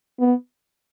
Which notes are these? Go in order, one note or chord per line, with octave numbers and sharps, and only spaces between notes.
B3